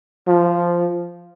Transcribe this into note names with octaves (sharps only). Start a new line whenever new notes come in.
F3